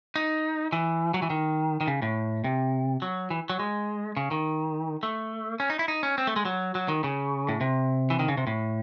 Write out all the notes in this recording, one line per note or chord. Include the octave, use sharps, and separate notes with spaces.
D#4
E3
F#3
E3
D#3
D#3
C#3
A2
C3
F#3
E3
F#3
G#3
C#3
D#3
A3
C#4
D#4
E4
D#4
C#4
C4
A3
G#3
F#3
F#3
D#3
C#3
A2
C3
E3
D#3
C#3
C3
A2